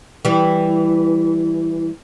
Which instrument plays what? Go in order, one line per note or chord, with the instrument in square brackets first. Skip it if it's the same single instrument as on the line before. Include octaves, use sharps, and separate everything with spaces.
[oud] E3 G3